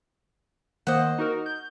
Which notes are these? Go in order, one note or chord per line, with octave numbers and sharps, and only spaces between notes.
D#3 A#3 C5 D#5 F#5
D#4 F#4 A#4
G6